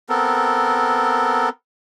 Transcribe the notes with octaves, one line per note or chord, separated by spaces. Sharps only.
B3 C4 A4 A#4